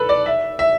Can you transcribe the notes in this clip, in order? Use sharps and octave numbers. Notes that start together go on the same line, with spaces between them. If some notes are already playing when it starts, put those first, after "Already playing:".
Already playing: A4 B4
D5
E5
E5